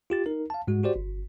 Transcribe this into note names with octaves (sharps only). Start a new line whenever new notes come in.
F4 G4 A6
D#4 A#4
F5 A5
G#2 G#3 F#4
F#4 G4 C5 D5
G1